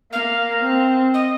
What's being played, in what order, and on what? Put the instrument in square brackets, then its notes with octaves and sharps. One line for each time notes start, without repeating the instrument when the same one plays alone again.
[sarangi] A#3 [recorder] F5
[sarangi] C4
[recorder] D#5